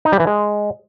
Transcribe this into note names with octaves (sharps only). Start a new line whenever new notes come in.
D#4
G3
E3
G#3